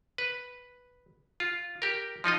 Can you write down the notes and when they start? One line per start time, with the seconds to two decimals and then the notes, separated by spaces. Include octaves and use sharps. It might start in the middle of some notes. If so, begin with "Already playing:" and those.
0.18 B4
1.40 F4
1.82 G4 A#4
2.24 F3 D#4 F4 D#5